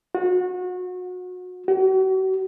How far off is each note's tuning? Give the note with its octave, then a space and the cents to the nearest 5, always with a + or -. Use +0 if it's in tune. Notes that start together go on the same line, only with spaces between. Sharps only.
F#4 -30
F#4 +40